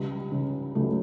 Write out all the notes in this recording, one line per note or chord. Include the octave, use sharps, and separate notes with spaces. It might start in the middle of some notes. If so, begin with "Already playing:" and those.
Already playing: C#2 G3
C#3
C#2 F#3 A3